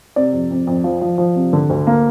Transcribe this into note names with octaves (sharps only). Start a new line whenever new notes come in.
C3 D5
F2
F2
F2
F3
F3
F3
C3
D3
D2
A#3